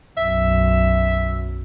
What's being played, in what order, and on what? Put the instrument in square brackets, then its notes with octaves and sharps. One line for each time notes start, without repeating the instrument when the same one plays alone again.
[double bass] B1 F#2 [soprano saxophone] E5